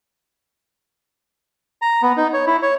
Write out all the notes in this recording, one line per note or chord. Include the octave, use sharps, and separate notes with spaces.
A#5
B3
D#4
C#5
E4
C#5